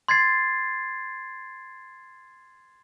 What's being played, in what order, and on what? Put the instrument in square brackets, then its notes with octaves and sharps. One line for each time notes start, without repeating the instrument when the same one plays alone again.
[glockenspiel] C6 G#6 A6 C7